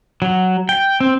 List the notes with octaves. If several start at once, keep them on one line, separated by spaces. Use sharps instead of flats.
F#3
G5
C4